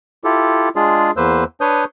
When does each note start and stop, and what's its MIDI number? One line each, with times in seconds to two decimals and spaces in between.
0.24 0.69 64
0.24 0.69 65
0.24 0.69 67
0.24 0.69 69
0.76 1.11 56
0.76 1.11 62
0.76 1.11 65
0.76 1.11 68
1.17 1.44 40
1.17 1.44 58
1.17 1.44 71
1.17 1.44 72
1.17 1.44 88
1.61 1.84 62
1.61 1.84 71
1.61 1.84 73
1.61 1.84 87
1.61 1.84 91